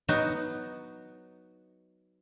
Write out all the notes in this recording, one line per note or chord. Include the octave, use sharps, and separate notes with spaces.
F#3 B3 D#4 F#4